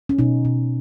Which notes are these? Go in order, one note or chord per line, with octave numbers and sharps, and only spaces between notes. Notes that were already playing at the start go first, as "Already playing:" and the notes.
C#4
B2 D#4
B2